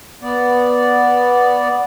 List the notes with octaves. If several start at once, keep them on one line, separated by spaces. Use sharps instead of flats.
B3 D5